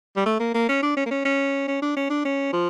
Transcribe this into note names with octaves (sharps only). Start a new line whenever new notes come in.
G3
A3
A#3
A#3
C#4
D4
C#4
A#3
C#4
C#4
C#4
D4
C#4
D4
C#4
F3